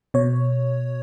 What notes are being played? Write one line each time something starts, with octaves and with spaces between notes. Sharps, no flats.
B2 C#5